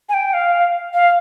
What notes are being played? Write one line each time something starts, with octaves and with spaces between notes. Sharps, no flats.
G#5
G5
F5
F5